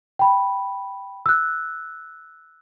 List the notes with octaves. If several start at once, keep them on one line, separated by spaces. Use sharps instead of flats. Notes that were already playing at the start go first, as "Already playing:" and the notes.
G5 B5
E6 F#6